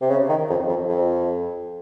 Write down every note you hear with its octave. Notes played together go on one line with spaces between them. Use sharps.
C3
C#3
D#3
F2
F2
F2